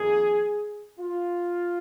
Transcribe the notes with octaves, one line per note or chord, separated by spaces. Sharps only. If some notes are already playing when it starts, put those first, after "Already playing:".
Already playing: F2 D#3 A#3 G#4
F4